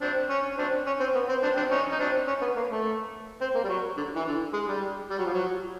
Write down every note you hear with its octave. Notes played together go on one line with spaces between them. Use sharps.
C4 D4
C#4
C4 D4
C#4
C4
B3
C4
C4 D4
C4 D4
C#4 D#4
D#4
C4 D4
C#4
B3
A#3
A3
C4
A#3
G3
F#3
D3
E3
D3
G#3
G3
G3
F#3
F3
F#3